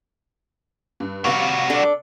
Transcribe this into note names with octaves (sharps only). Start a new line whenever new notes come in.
G2
C3 G3 F#4 F5 C#6
D4 A4